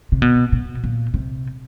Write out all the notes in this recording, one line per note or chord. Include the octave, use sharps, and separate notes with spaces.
C3
B2
B2
A#2
C3